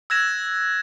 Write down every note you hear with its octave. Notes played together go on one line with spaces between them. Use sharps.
E6 F#6 G#6 A#6 E7